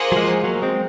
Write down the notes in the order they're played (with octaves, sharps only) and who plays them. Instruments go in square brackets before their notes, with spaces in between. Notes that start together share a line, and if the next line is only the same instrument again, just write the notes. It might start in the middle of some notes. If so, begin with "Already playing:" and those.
Already playing: [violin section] A#3 F4 G#4 C5 F#5
[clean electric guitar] F#3
F3 G#3
F#3 A#3
G#3 C4